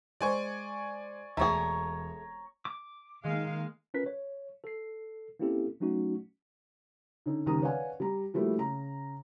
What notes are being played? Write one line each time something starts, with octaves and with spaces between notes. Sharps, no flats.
G#3 C5 D5 G#5 C#6
E1 A3 G#4 C#5 A#5
D6
D#3 G#3 A#3 F5
C#4 F4 A#4 B4 F#6 B6
C#5
A4 C7
A#3 C4 C#4 E4 G4 A4
F#3 A3 C#4 D#4 F#4
D3 C#4 D#4
F#1 C#2 D#3 G3 A#5 D#6
B4 C#5 D5 F5 F#5 G#5
G3 A#5
F3 G3 A3 A#3 E4 F#4
C#3 A#5